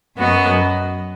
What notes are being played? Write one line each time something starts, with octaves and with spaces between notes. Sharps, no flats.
F#2 F#3 B3 F#4 D#5